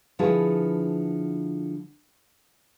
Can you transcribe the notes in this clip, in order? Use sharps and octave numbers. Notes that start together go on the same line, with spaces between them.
D3 F3 E4 F#4 G#4 B4